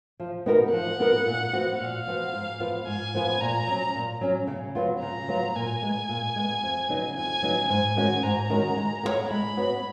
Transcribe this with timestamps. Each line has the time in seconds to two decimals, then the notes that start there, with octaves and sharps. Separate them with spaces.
0.20 F3
0.46 B3 D#4 F#4 A#4
0.72 F3 F#5
1.00 B3 D#4 F#4 A#4
1.26 A#2
1.53 F3 B3 F#4
1.79 A#2 F5
2.07 F3 B3 F#4
2.34 G#2
2.60 F3 B3 F4 B4
2.87 G#2 G#5
3.14 F3 B3 F4 B4
3.41 A#2 A#5
3.67 F#3 C#4
3.95 A#2
4.21 F#3 C#4
4.47 C#3
4.75 F#3 B3 F4
5.01 C#3 A#5
5.28 F#3 B3 F4
5.55 A#2 G#5
5.83 G#3 B3
6.09 A#2
6.36 G#3 B3
6.63 F2
6.89 C#3 F#3 B3 D#4
7.16 F2 G#5
7.42 C#3 F#3 B3 D#4
7.69 G#2 G#5
7.96 D#3 G#3 C#4 F#4
8.23 G#2 A#5
8.50 D#3 G#3 C#4 F#4
8.77 G#3
9.03 B3 F#4 C#5
9.31 G#3 B5
9.57 B3 F#4 C#5